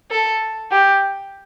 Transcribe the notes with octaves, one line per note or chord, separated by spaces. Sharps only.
A4
G4